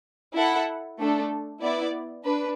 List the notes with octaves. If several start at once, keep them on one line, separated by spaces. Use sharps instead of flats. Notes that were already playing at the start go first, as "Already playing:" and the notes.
E4 A4 F#5
A3 D4 A4
B3 E4 D5
D4 B4